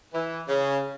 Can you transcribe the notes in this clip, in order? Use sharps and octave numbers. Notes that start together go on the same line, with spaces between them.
E3
C#3